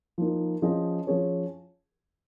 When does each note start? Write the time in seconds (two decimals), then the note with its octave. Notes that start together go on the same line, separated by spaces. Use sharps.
0.18 F3 A#3 D#4
0.62 F3 C#4 G#4 D#5
1.07 F3 C#4 G#4 C#5